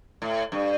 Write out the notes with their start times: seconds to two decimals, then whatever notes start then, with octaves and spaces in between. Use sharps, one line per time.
0.22 A2
0.52 G2